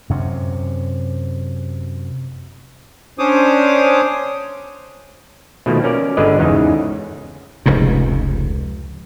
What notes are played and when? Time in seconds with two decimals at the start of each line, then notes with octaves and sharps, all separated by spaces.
0.10 F#2 C3
3.19 C#4 D4 C5 C#5 D6 D#6
5.66 B2 D#3 F3 A3 A#3
5.84 C#4 A#4 D5
6.17 G1 D3 G#3 B4 D5 D#5
6.39 E2 G#2 C#3 D#4
7.66 F1 C#2 G#2 C3